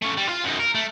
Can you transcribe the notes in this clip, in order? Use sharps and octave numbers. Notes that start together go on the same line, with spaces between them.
A3 C#4
G3
F4 F5
F#2 D#4
A#4
A3